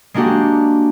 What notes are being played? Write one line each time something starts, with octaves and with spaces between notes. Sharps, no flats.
G#3 A#3 D4 F#4 G4